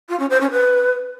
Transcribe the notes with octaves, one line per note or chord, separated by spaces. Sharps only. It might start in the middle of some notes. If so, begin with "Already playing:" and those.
F4
C#4
C5
C#4
B4